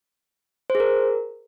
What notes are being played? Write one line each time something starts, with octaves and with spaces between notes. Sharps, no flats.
C5
G#4
A#4